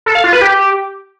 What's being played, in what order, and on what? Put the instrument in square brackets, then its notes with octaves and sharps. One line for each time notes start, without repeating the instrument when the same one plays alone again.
[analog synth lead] A4
F5
F4
B4
G4